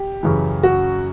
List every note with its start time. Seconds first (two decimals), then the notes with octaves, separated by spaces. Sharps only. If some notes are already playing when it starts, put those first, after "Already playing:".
Already playing: G4
0.23 F#2 C#3 E3
0.63 F#4